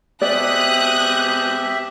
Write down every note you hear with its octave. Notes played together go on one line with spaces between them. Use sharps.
B2 G#3 C4 G4 D5 E5 D#6 F#6